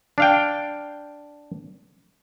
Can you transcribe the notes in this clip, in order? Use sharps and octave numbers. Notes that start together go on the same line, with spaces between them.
D4 F5 G5